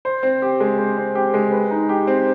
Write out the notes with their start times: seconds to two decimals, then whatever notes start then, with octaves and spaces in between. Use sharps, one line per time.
0.05 C5
0.23 C4
0.42 G4
0.60 G#3
0.78 C5
0.97 C4
1.15 G4
1.34 G#3
1.52 B4
1.71 D#4
1.89 G4
2.07 C4